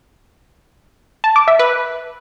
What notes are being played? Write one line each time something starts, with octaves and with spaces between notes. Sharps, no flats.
A5
D6
E5
B4